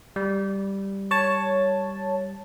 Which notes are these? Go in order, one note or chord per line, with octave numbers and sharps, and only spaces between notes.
G3
C#5 A5